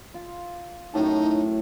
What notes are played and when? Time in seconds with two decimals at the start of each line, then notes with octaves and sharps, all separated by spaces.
0.14 F4
0.94 F#2 A2 D#4 A5